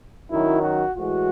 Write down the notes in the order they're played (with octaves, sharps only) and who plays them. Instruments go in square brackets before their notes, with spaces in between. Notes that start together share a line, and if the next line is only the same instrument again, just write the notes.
[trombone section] F#2 D#3 F#3 E4
F#4
A2 E3 G#3 F#4